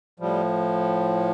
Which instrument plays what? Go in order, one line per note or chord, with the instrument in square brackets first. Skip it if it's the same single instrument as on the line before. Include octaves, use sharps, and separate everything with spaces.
[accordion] A2 F3 G3